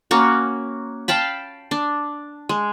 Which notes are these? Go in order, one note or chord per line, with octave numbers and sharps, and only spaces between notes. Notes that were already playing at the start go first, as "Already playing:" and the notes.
A#3 C#4 F#4
F5 G5 A5 B5
D4
G#3